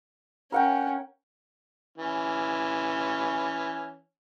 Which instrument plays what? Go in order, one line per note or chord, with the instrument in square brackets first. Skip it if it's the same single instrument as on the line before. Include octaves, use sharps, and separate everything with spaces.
[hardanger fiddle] C#4 [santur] A#4 F#5 G5
[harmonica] E3 C#4